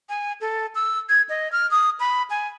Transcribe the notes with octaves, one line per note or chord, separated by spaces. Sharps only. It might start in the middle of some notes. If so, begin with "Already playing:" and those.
G#5
A4
E6
G#6
D#5
F6
D#6
B5
G#5